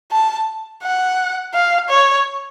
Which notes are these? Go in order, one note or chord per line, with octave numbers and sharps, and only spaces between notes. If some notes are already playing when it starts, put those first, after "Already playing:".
A5
F#5
F5
C#5